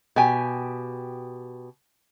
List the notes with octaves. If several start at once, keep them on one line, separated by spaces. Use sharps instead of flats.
B2 G4 G5 G#5